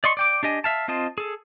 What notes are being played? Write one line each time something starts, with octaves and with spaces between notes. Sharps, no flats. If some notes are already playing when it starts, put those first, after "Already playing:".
D5 D#5 C6 C#6
D5 G5 D6
D4 G4 D#5 G#5
E5 F5 A5
C4 F4 D#5 A5
G#4 A4